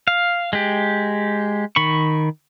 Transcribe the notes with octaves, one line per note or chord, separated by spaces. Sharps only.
F5
G#3 G4
D#3 B5 C#6